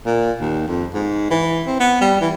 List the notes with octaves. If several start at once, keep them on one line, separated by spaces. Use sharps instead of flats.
A#2
D#2
F2
G#2
E3
C4
B3
G3
E3